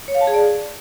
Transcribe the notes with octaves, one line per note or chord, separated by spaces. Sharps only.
C#5
F5
A5
G#4
D5